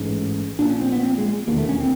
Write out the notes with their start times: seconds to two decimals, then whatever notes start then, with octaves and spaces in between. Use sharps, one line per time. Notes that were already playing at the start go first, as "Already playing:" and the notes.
Already playing: A1 G#2 C#4
0.59 A#1 A#2 D4
0.70 C#4
0.81 C4
0.92 B3
1.03 C4
1.18 G#3
1.47 E1 D#2 D3 A#3
1.58 A3
1.69 C#4
1.80 C4